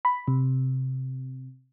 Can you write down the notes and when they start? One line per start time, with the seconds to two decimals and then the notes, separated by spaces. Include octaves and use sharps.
0.05 B5
0.28 C3